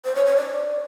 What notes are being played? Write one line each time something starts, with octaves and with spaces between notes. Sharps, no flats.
C5
C#5
C#5
D5